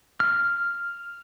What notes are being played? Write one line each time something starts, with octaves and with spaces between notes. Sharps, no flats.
F6